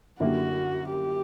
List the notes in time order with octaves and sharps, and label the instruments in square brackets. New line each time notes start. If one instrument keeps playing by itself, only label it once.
[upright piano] F#2 D3 A#3 E4 G4 [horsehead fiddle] F#4
[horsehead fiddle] G4